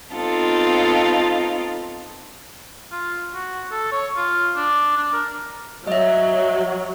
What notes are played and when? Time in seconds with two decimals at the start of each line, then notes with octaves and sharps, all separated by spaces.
0.12 B3 C4 D#4 F4 A4
2.91 F4
3.34 F#4
3.71 A4
3.92 C#5
4.16 F4
4.56 D4
4.97 D4
5.13 A#4
5.87 F#3 D#5 E5